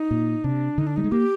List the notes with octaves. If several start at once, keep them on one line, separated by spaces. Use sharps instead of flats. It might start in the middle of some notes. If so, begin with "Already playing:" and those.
Already playing: D#4
A#2
C3 D4
D3 D#4
D4
G3 D#4
G#3
A#3 G4